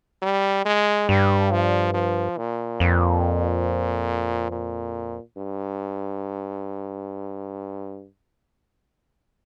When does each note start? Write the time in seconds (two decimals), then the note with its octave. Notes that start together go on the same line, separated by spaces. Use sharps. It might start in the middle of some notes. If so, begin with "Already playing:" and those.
0.22 G3
0.65 G#3
1.09 G2 G3
1.51 F3
1.94 F3
2.37 A#2
2.80 F2
4.51 A#2
5.37 G2